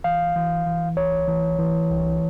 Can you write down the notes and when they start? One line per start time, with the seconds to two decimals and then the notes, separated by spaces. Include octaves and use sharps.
0.04 E3 F5
0.36 E3
0.66 E3
0.97 C2 C#5
1.28 E3
1.59 E3
1.90 C2